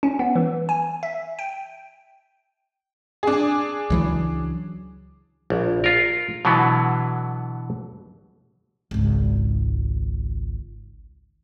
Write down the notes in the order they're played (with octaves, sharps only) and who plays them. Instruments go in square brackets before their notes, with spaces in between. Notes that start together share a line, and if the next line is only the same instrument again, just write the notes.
[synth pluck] C#4
B3
E3
G#5
E5
G5
[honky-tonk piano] D4 G#4
[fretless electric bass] C#2 E3 F#3
[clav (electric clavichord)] A#1
F4 A#4
B2 D3 E3 F#3 B3
[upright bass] G#1 C#2